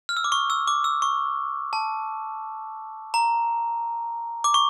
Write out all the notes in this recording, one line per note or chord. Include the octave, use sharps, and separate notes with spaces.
F6
E6
D6
C#6
E6
D6
E6
C#6
A5
A#5
D6
C#6